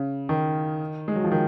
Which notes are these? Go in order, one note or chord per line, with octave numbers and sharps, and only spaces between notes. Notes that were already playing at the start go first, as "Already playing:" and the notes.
Already playing: C#3
D#3
G#3
F#3
F3
D#3